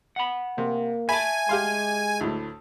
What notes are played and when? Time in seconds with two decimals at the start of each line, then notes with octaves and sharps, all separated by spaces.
0.16 F#5 B5
0.58 C3 A#3
1.09 E5 G#5 A5 B5
1.49 G#3 G4 F5 C6
2.21 D2 A2